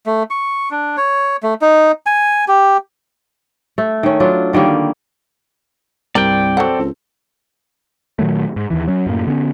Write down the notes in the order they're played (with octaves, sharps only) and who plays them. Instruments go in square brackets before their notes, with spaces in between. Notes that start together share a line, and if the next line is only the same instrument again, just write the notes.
[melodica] A3
C#6
D4
C#5
A3
D#4
G#5
G4
[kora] A3
D#3 C#4
F#3 D4 F4
D3 D#3 G3 A#3
[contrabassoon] C2 [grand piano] G2 [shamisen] C4 A#4 [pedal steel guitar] D5 G5
[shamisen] F#3 F#5 [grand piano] C4 A4
[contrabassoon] C#2
[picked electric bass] A#2 D#3 F#3 A3
G#2
D#2 E3
F#3 C#4
F#2 A2 A#3
D3 B3 C#4